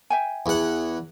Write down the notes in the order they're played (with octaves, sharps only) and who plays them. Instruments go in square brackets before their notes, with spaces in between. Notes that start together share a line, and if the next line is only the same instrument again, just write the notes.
[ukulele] E5 G5 G#5
[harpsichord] E2 F#5